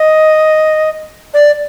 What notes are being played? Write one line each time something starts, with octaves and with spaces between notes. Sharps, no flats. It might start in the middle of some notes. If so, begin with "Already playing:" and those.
Already playing: D#5
D5